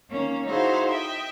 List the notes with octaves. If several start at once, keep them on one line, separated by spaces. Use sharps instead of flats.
D#3 A#3 C#4
D#4 E4 F#4 G#4 C5 F5
D#5 E5 G5